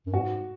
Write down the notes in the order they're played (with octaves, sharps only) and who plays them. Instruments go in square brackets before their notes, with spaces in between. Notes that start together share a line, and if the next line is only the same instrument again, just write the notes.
[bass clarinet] F#2
[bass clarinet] G#2 [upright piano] F#4